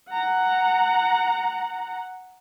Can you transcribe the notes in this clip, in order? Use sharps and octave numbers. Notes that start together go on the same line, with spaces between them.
F#5 A#5